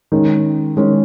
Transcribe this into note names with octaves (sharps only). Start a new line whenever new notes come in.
D#3 G#3 C#4
D#3 G#3 C#4